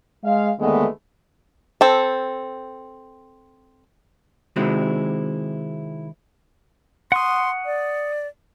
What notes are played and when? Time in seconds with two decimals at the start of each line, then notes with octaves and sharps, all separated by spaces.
0.24 G#3 F5
0.60 D#2 D3 D#3 G#3 A3 B3
1.81 C4 A4
4.56 C3 D#3 G#3 C4 E4 F#4
7.12 F#5 C6 C#6 D#6
7.65 D5